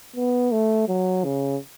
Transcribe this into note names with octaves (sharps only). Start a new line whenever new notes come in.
B3
A3
F#3
C#3